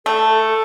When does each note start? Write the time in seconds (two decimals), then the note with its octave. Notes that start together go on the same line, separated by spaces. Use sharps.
0.06 A3 A4
0.29 A4